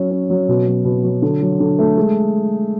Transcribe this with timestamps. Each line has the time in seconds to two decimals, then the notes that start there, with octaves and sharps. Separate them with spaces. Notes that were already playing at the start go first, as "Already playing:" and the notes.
Already playing: F#3 C#4
0.11 C#4
0.30 F#3
0.48 B2
0.67 F#3
0.85 B2
1.03 F#3
1.22 D3
1.41 F#3
1.60 D3
1.79 A3
1.97 G#3